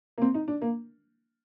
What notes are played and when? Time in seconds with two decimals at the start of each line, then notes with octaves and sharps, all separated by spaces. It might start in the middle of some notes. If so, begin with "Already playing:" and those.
0.18 A#3
0.22 C4
0.34 D#4
0.48 D4
0.62 A#3